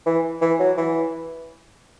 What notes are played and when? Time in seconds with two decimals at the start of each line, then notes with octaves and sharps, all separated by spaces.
0.06 E3
0.41 E3
0.59 F#3
0.77 E3